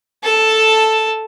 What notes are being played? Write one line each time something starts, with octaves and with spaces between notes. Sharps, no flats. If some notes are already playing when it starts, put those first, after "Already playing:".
A4 A5